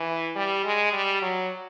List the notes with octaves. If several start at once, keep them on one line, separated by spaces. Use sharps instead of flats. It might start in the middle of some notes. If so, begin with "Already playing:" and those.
Already playing: E3
G3
G#3
G3
F#3